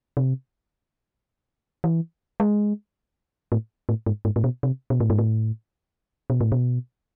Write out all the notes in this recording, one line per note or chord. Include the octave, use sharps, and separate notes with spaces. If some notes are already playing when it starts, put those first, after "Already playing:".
C3
E3
G#3
A2
A2
G#2
G#2
A2
B2
C3
B2
A2
G#2
A2
B2
A2
B2